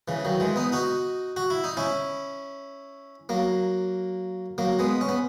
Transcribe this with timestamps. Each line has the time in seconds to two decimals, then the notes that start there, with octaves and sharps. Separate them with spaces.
0.08 C#3 E3
0.25 D#3 F#3
0.40 E3 G#3
0.56 B3 D#4
0.72 D#4 F#4
1.36 F#4
1.50 E4
1.64 D#4
1.77 C#4 E4
3.29 F#3 A#3
4.58 F#3 A#3
4.79 G#3 B3
5.01 C#4
5.09 B3